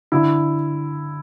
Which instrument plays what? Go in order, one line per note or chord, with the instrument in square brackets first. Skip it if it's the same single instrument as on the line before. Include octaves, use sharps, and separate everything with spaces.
[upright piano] D3 E4